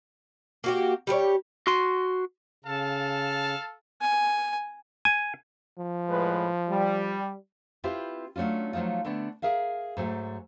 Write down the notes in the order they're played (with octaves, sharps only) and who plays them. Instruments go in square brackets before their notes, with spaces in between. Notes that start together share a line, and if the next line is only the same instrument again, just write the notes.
[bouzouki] A#3 F#4 G4
G3 G4 A#4 C#5
[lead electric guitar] F#4 C6
[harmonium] C#3 [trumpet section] A4 F5 A5
[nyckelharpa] G#5
[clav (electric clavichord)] G#5
[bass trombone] F3
[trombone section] A2 G#3 B4
G3
[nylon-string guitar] C4 E4 F4 G4 B4
F#3 A3 C#4 D4 F4
F3 F#3 A3 D#4 F4
D3 A3 B3 D4
G#4 A#4 E5 F5
G#2 F#3 A3